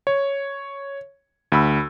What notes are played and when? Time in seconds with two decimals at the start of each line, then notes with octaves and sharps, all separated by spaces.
0.07 C#5
1.52 D2 B5 E6